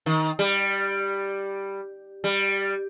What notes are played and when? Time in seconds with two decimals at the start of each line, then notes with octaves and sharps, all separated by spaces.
0.06 D#3
0.39 G3
2.24 G3